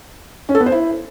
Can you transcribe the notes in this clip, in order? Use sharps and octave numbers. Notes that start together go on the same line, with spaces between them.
C#4
A4
B3
C5
E4